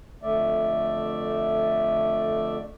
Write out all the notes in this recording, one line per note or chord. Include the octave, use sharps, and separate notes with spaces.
F2 D3 A3 D5 E5